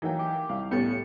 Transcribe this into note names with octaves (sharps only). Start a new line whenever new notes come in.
E3 F#3 A#3 D#4 A#4 G5
G4
C2 F5
A2 G3 B3 C#4 G4 A4 C#7